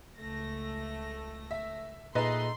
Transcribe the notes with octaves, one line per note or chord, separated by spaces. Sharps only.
C#2 A3 A#6
E5
A#2 A3 D#4 G#4 B4 D#5 C6